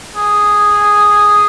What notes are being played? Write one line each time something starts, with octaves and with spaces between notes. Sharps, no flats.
G#4